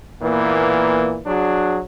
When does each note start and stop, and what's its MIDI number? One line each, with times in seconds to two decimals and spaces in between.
0.22 1.18 46
0.22 1.18 52
0.22 1.18 58
0.22 1.18 59
1.26 1.80 54
1.26 1.80 62
1.26 1.80 66
1.26 1.80 68